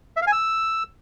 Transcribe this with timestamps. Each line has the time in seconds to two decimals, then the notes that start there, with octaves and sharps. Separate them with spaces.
0.17 E5
0.22 F5
0.27 G#5
0.32 E6